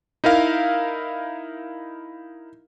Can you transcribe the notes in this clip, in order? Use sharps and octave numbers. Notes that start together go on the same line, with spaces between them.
D#4 E4 A#4 F5